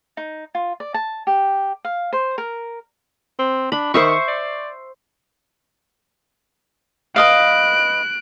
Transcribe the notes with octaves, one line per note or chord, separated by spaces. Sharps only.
D#4
F4
D5
A5
G4
F5
C5
A#4
C4
D4 B5
D#3 C5 E5 C#6
D5
B4 D#5 F5 F#6 D7